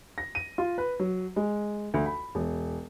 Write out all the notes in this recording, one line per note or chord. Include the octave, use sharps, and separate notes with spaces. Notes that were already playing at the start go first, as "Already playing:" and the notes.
A#6
D#7
F4
B4
F#3
G#3
D2
B5
E1